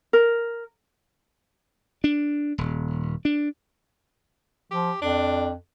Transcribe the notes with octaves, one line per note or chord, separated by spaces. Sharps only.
A#4
D4
D#1
D4
F3 G4
F2 D4